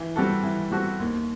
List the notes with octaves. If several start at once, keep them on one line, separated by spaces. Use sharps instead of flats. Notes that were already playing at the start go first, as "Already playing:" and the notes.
Already playing: E3
G3 C4 F#4 A4
E3
G3 C4 F#4 A4
D#2